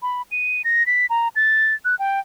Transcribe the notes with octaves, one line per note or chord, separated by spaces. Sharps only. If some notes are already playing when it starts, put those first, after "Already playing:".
B5
D#7
A#6
B6
A#5
A6
F#6
G5